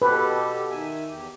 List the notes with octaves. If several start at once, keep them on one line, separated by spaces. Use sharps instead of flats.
B2 G4 A4 B4
D#3 E5 G#5
E2 G4